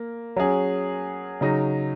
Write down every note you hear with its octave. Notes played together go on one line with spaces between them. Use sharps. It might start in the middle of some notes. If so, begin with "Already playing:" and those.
Already playing: A#3
F#3 C#4 G#4
C#3 F#3 D#4